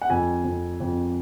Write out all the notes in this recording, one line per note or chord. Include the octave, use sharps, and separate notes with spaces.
F#5
F2 G#5
F2
F2